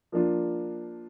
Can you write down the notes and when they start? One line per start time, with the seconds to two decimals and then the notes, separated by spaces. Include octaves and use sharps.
0.12 F3 A#3 D4 F4